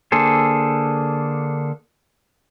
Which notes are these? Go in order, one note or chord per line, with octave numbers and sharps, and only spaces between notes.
D3 A#3 G#4 A4 C5